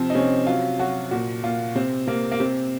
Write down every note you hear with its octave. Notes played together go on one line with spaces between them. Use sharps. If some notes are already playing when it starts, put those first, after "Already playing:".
Already playing: C3 F3 C4
D#4
C3 C#4
F#3 F4
F#3 F#4
A#2 F#4
A#2 F4
C3 C4
C3 A#3
A#3
C3 C4